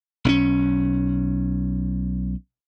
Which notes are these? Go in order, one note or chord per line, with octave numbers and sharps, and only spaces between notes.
B1 C4 C#4